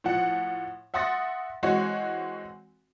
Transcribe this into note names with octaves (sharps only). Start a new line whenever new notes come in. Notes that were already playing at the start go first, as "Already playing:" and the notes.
A2 F3 F#5
E5 F#5 C6 D#6 A6 A#6
E3 G#3 C4 F#4 C#5